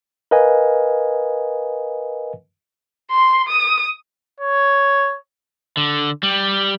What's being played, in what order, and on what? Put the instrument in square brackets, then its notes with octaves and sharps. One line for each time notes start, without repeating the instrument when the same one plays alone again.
[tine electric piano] A#4 B4 D#5 F5 G#5
[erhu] C6
D#6
[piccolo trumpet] C#5
[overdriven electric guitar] D3
G3